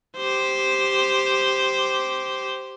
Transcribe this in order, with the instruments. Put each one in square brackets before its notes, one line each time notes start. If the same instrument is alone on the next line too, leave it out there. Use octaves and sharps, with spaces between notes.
[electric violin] G4 C5